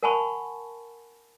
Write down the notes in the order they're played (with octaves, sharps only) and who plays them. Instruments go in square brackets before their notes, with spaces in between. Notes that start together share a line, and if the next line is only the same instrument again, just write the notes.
[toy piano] A#4 F#5 G#5 A5 B5 C#6